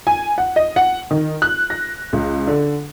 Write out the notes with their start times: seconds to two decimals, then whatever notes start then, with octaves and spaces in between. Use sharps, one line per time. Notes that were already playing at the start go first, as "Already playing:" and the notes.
0.07 G#5
0.38 F#5
0.56 D#5
0.76 F#5
1.11 D#3
1.42 F#6
1.70 A#6
2.13 C#2
2.47 D3